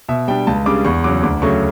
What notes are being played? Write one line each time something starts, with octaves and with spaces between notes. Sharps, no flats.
B2 E5
G3 D4 G5
C#2 A5
C#3 G3 D4 D6
E2 C#6
C#3 F#3 D6
D2 D6
C#3 F#3 A3 C#6